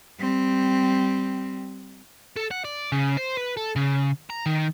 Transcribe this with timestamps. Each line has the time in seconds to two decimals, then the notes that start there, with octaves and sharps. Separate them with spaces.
0.20 G3 C4
2.36 A4
2.51 F#5
2.65 D5
2.92 C#3
3.17 C5
3.37 B4
3.57 A4
3.76 C#3
4.30 A#5
4.46 D#3